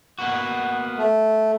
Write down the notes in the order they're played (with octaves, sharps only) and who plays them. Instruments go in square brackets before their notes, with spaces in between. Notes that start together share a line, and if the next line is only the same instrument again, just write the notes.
[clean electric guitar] A#3 B3 F#4
[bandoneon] A3